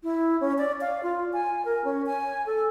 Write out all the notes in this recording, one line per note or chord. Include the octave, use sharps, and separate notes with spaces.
E4
C#4
D5
F5
F4
G#5
A#4
C#4
G#5
A4